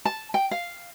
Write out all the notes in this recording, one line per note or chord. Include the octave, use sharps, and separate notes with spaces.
A5
G5
F5